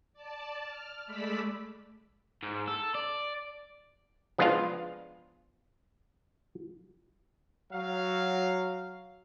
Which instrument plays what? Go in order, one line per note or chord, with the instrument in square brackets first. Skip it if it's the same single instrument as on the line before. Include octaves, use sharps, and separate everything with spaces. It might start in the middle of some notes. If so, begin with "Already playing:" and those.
[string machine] D5 A5
F6
G#3 A3 D5 B5 E6 B6
[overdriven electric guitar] G#2
A4
D5
[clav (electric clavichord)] F3 G#3 B3 D4 F4 F5
[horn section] F#3 F5